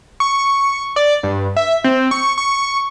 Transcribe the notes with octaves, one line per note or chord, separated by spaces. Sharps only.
C#6
D5
G2
E5
C4
C#6
C#6